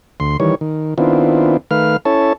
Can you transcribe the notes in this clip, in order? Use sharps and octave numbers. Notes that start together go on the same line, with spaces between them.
D2 C6
D#3 E3 G3 C#5
D#3
D#3 B3 C4 D4 E4 F4
D#3 A3 B4 F5 F6
C#4 E4 A4 C#5 A5